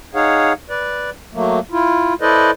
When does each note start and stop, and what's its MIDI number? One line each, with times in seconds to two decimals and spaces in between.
0.15 0.53 63
0.15 0.53 68
0.15 0.53 73
0.15 0.53 77
0.15 0.53 78
0.70 1.10 71
0.70 1.10 74
1.34 1.60 54
1.34 1.60 57
1.34 1.60 58
1.71 2.14 64
1.71 2.14 65
2.21 2.51 64
2.21 2.51 69
2.21 2.51 71
2.21 2.51 72
2.21 2.51 74
2.21 2.51 75